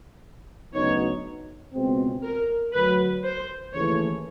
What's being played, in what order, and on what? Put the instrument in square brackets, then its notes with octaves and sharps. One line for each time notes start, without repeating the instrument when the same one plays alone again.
[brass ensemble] D2 C#3 F#3 B3 D#4 [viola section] C#5
[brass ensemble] C#2 B2 G#3 C4
[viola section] A#4
[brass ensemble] D2 D3 F#3 [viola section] B4
[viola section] C5
[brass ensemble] D#2 C#3 E3 A3 [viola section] C#5